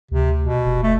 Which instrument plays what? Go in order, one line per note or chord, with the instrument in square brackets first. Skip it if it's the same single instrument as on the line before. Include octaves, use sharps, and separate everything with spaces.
[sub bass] D2 [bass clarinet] C3
[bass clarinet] B2
[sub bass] F1
[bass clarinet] A3